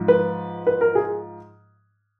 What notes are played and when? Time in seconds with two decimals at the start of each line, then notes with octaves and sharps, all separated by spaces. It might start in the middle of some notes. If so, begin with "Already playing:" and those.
Already playing: G#2 F3
0.08 B4
0.67 B4
0.81 A#4
0.95 G#4